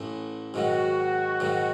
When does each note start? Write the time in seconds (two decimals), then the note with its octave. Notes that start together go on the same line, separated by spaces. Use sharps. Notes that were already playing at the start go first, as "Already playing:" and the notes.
Already playing: A1 A2 E3 A3
0.54 G#2 D#3 F#3 F#4
1.40 G#2 D#3 F#3